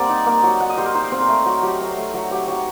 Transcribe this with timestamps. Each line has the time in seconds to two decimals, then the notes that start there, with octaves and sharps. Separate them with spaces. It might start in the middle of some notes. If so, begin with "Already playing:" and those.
Already playing: G3 A#3 C4 D5 F#5 A#5
0.09 D#4
0.26 A#3
0.43 F#3
0.60 D#4 F#5
0.69 D#5
0.78 G3 C5
0.86 A#4
0.94 D#4 C5
1.03 D5
1.12 C4 C5
1.21 A#4
1.29 A3
1.46 F#3
1.62 F#3 G4
1.80 F#3
1.97 A3
2.14 F#3
2.31 F#3 G4
2.48 F#3